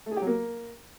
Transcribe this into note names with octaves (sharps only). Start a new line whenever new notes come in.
A3
G#4
G4
F#3
A#3